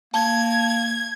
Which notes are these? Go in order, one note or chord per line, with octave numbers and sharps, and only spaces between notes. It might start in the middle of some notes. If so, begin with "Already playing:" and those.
A#3 A5 G#6